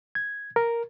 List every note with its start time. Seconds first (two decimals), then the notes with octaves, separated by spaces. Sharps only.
0.15 G#6
0.56 A#4